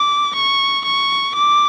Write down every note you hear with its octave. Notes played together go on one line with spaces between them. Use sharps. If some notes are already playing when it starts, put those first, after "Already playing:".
Already playing: D6
C#6
C#6
D6